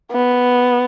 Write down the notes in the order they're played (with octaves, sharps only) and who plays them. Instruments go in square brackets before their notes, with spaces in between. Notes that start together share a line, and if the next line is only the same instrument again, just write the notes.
[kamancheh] B3